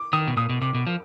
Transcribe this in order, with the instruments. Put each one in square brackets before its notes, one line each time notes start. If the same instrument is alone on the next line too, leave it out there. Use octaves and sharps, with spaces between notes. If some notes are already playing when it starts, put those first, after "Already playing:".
Already playing: [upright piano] D6
[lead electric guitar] D#3 [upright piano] D#6
[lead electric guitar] B2
[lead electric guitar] A#2 [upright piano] D#6
[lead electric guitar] B2
[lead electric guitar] C3 [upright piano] D6
[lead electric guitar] B2
F3